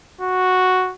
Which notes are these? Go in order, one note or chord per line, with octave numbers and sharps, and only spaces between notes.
F#4